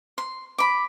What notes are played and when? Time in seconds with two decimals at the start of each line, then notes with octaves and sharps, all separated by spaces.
0.18 C6
0.58 B5 D6